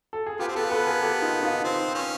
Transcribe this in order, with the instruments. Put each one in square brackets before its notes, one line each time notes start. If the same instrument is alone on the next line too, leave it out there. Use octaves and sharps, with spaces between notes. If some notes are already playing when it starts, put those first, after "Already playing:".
[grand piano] A4
G#4
[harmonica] B3 [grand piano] F4 G4
[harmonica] C4
[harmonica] B3 [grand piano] G4 A4
[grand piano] A4 B4
G#4 A#4
G4 A4
D#4 F4
D#4 F4
[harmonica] C4
C#4